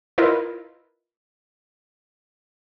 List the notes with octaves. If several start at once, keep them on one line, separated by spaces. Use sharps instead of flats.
E4 F4 A#4 B4 D#5